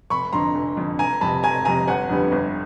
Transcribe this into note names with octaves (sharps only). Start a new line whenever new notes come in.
F1 B5 C#6
F2 D3 A#5 C6
F1
F2 D3
F1 G#5 A#5
F2 C3 A5 B5
F1 G#5 A#5
F2 C3 G#5 A#5
G1 F#5 G#5
F2 D3 G3 B3
G1